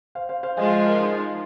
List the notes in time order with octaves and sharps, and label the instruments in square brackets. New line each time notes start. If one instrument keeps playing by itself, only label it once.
[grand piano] C5 F5
C5 F5
C5 F5
[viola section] F3 G#3 F4 [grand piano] D#5 G#5
[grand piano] C5 F5
A#4 D#5
D#4 G#4